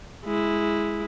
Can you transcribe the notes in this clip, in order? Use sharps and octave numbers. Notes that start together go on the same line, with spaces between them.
G#3 E4